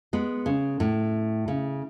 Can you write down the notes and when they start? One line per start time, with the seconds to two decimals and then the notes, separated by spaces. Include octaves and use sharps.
0.13 G#3 B3
0.46 C#3
0.80 A2
1.48 C#3